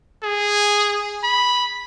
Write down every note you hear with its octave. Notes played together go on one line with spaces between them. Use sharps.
G#4
B5